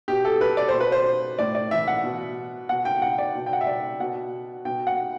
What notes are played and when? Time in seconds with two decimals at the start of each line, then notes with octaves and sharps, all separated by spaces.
0.08 B2 G4
0.25 A4
0.41 B4
0.57 D5
0.69 C5
0.74 B2
0.80 B4
0.92 C5
1.39 A2 D5
1.55 D5
1.71 E3 E5
1.88 F#5
2.04 B2
2.69 B2 F#5
2.85 G5
3.02 F#5
3.18 D5
3.35 B2
3.46 G5
3.53 F#5
3.61 E5
3.67 D5
4.00 B2 F#5
4.65 B2 G5
4.87 F#5